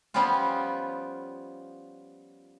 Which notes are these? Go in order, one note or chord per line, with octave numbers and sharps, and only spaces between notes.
F3 G3 B3 C#4 F4